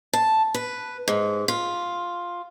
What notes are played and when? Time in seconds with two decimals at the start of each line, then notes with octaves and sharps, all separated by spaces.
0.13 A5
0.54 B4
1.08 G#2
1.48 F4